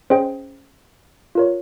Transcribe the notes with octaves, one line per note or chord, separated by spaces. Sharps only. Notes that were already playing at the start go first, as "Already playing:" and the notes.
C#4 G#4 C5 D#5 G5
F4 A#4 C#5